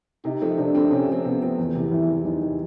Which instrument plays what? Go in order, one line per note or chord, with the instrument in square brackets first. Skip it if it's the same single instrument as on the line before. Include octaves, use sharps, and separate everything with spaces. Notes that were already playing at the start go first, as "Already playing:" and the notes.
[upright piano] C3 [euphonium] D#4
[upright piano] F3 A3 C4
[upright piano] C3 [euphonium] D4
[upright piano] F3 A3 C4
[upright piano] C3 [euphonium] C#4
[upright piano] F3 A3 C4
[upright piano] C3 [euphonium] B3
[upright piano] F3 A3 C4
E2
C3 E3
[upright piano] E2 [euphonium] E4
[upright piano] C3 E3
[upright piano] E2 [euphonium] D#4
[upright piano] C3 E3